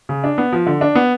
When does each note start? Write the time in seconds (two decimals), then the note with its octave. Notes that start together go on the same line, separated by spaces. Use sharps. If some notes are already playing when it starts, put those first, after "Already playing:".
0.09 C#3
0.24 D4
0.38 B3
0.53 F3
0.66 D3
0.81 D4
0.95 B3